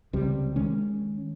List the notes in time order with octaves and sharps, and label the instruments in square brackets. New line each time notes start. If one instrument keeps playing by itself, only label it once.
[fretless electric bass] C#2 C3 G3
D#3 G#3 C#4